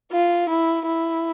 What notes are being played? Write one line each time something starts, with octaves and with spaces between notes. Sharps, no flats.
F4
E4
E4